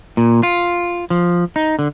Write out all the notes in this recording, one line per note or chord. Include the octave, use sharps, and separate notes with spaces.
A#2
F4
F3
D#4
D3